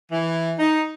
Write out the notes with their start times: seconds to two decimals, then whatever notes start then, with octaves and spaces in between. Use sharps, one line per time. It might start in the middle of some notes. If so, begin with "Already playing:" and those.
0.12 E3
0.59 D#4